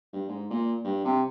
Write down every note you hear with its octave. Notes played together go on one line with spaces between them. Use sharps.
G2
G#2
A#2
G2
C3